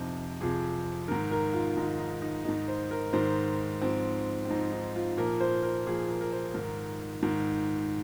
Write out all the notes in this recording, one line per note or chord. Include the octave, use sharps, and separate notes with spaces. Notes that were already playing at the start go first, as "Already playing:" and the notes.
Already playing: F2 C3 F3 D#4
F2 C3 F3 G#4
G#2 D#3 A#4
A#4
F4
G#2 D#3 D#4
D#4
D#4
G#2 D#3 D#4
C5
A#4
G#2 D#3 C5
G#2 F3 C4
C4
G#2 F3 D#4
D#4
F4
A#2 F3 A#4
C5
A#4
A#2 F3 G#4
A#4
A#4
C5
G#2 D#3 A#4
G#2 D#3